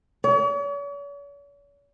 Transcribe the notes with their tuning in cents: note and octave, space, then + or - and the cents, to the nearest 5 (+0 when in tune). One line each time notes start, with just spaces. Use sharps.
C#5 +45